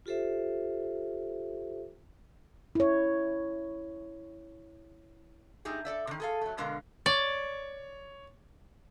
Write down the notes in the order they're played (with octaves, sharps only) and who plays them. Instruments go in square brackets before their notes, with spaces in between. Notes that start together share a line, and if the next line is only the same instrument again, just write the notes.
[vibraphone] F4 G4 A4 C5 E5
[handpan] E4 C#5
[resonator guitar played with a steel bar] A3 D#4 G4 G#4
A4 D5 E5
C3 D#3
G#4 A4 F5
F#3 A3
B2 D3 G#3 A#4 F5
[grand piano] C#5 [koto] D5